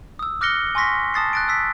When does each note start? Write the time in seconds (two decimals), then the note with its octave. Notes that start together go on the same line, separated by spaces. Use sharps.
0.19 D#6 E6
0.41 D6 F6 F#6 A#6 C#7 G7
0.75 G#5 C6 C#6 A#6 B6
1.14 A5 D#6 A6 C7
1.33 F#6 A6 D7
1.48 D#6 E6 B6